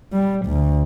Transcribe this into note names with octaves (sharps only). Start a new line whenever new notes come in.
G3
D2